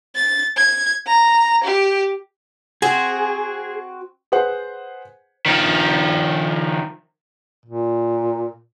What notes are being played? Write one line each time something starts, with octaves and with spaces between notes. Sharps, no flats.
A6
G#6
A#5
G4
C4 F#4 G#4
G#4 B4 C5 F#5
D#3 F3
A#2